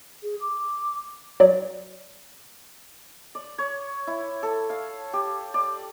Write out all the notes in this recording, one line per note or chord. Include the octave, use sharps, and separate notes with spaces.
G#4
D6
F#3 D5
D5
C#5
E4
A4
F5
G4
D5